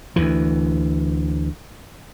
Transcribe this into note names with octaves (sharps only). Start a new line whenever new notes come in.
D2 E3